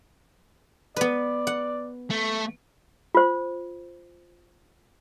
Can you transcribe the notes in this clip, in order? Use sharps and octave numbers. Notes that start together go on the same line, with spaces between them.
B3 B4 D5
F#5
A3
F4 C5